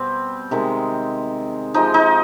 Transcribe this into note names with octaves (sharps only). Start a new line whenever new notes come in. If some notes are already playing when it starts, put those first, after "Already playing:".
Already playing: B2 G3 C4
C3 D#3 G#3
C3 F3 G#3 D#4
D#4